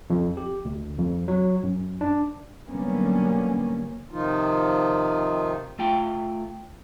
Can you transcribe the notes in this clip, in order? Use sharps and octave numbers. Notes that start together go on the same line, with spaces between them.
F2
G4
D2
F2
F#3
F#2
D4
D3 F#3 G3 A#3 B3 C#4
C3 D#3 F3 D#4 F4
A3 F4 G5